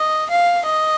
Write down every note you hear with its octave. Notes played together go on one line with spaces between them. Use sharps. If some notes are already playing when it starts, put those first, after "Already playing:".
Already playing: D#5
F5
D#5